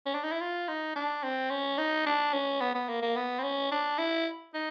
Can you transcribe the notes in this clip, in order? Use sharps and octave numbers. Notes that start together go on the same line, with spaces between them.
C#4
D4
D#4
E4
F4
D#4
D4
C4
C#4
D#4
D4
C#4
B3
B3
A#3
A#3
B3
C4
C#4
D4
E4
D#4